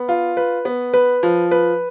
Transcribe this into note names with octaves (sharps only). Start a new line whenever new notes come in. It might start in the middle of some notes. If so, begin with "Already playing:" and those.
Already playing: B3
F4
B4
B3
B4
F3
B4